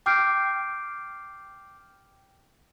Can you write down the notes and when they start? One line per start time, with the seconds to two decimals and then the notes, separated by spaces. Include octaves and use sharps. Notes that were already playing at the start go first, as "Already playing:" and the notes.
0.06 G5 D6 F6 G6 C7 D7